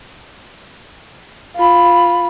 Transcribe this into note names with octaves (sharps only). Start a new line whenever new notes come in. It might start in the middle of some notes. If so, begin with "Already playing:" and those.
F4 B5